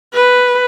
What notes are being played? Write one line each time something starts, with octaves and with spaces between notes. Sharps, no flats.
B4